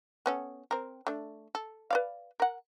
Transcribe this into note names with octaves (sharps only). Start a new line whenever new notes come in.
B3 C#4 A4
C4 A#4
A3 D4
A4
B4 D5 F5
A#4 F#5